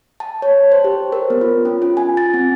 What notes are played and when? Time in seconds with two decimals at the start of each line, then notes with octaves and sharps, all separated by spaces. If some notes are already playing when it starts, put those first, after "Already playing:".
0.20 A5
0.42 C#5
0.72 C5
0.84 G4
1.12 A#4
1.30 B3
1.41 F4
1.65 C#4
1.82 F4
1.97 G#5
2.17 A6
2.34 C4